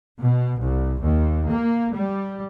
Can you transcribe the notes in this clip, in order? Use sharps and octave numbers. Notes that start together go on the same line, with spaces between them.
B2
C2
D#2
A#3
G3